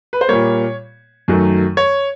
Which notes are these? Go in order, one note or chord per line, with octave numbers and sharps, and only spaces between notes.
B4
C5
A#2 G3 A#3 C#5
F#2 D#3 F#3 A3
C#5